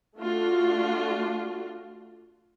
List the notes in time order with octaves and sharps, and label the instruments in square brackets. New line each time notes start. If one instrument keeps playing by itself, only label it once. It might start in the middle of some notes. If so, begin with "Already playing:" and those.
[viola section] A3 D4 F4 F#4